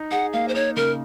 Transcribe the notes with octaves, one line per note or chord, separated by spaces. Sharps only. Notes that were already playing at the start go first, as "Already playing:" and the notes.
Already playing: D#4
G#4 F#5
A#3 F5
C5
D#4 C#5
C#3 A#4